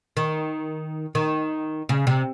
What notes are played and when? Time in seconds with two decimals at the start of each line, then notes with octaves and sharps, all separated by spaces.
0.17 D#3
1.15 D#3
1.89 C#3
2.07 C3